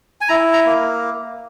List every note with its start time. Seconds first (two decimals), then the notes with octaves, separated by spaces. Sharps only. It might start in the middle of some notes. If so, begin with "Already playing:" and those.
0.21 G#5
0.29 E4 A#5
0.53 A#5
0.66 A#3